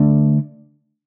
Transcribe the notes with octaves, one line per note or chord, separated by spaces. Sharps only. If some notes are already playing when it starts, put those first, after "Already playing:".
Already playing: D3 A3 D4